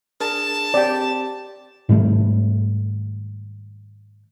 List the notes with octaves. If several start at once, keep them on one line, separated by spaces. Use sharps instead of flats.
D4 G#4 A#4 A5
C4 G4 D5 G5
G#2 D#3 G3 A3